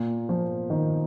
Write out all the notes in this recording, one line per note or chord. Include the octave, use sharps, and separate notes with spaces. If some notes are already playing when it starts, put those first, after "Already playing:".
Already playing: A#2
F3
D#3